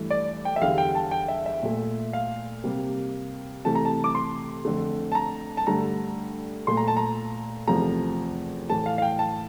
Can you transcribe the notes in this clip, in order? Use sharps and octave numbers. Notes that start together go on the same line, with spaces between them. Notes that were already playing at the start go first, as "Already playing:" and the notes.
Already playing: G2 E3 A3
D5
G5
E5
E2 D3 G3 F5
G5
A5
G5
E5
E5
A#2 A3
F5
C3 G3 A#3
C3 E3 A3 A5
A#5
A5
D6
C6
F2 D3 A3
A5
A#5
A5
G2 D3 A3 A#5
A#2 A3 C6
A#5
A5
A#5
E2 C3 F3 A3 A#5
A2 E3 A3 A5
F5
F5
G5
A5